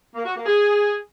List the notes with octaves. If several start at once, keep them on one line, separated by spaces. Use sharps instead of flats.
A#3
F#4
A#3
G#4